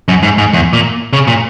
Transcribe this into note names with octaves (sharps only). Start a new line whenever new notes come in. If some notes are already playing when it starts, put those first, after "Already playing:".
F#2
G#2
G#2
E2
A#2
C#3
A#2